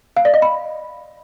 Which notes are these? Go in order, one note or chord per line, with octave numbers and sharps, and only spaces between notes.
F5
D5
D#5
B5